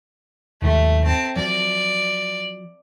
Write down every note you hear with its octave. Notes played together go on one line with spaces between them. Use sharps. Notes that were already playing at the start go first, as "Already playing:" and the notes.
D#2 G#2 G3 A3
C4 A5
F3 F#3 D5